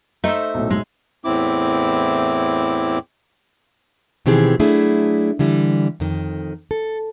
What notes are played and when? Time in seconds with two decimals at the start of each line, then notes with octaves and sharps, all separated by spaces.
0.24 A3 D#4 C5 E5
0.54 B1 A2
0.70 G#3
1.24 E2 A2 C4 E4 D6
4.26 B2 D#3 E3 C4 G4 G#4
4.60 F#3 A3 D4 E4 G#4
5.39 D3 E3 G3
6.00 F2 D#3
6.71 A4